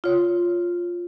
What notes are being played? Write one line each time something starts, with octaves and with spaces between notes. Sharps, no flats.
F4 C#5